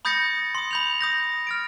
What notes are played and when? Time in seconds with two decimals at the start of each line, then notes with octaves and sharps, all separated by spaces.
0.05 B5 D#6 G6 A6 A#6 C#7
0.55 C6 D#6
0.71 B5 G6 F7
1.01 D#6 G6 A#6
1.47 F6 A6 D7